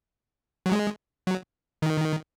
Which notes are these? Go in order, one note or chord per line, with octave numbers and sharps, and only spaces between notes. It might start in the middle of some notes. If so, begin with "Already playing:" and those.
F#3
G#3
F#3
D#3